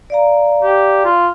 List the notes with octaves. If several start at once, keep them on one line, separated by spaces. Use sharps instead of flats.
D5 F5 A#5
G4
F4